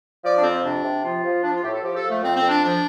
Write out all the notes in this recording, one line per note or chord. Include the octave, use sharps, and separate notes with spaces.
F3 D5
D4
F2 C4
C3 D4
C3
F3 F4
F3
F3 D4
F4
A2 G4
A4
F3 G4
A4
F3
A3
F2 C4
C4
F2
D4
F3 D4